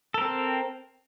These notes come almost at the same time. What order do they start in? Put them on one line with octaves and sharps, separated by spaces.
A4 A#4 C4